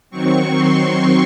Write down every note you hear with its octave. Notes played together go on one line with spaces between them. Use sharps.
D#3 F#3 C4 C#6
C6